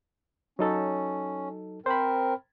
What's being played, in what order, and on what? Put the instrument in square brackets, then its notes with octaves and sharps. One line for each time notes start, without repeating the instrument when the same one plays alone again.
[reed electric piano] F#3 D#4 A4 [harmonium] C#4
[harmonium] C4 A#4 [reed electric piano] C5 B5